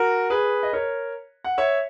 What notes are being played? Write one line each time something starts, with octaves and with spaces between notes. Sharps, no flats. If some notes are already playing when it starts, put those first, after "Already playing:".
Already playing: F#4 A#4
G#4 B4
D#5
A#4 C#5
F#5
C#5 E5